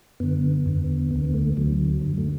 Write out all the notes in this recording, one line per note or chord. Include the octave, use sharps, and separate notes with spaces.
F#2 D3 B3
E2 D3
D2 D3 B3
B3
A3
D2 D3 F#3
F#2 D3 F#3
A3